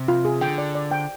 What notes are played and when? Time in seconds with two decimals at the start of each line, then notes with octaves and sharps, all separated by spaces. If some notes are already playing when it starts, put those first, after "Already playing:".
Already playing: C3
0.08 F4
0.25 G#4
0.41 D3 G5
0.58 D5
0.75 D5
0.91 G5